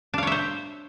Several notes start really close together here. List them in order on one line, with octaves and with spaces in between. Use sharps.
D4 F5 C#5 E5 C5